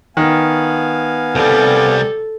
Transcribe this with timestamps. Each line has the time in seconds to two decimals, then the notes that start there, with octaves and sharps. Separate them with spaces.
0.17 D#3 B3 F5 G#5
1.35 C2 G3 A4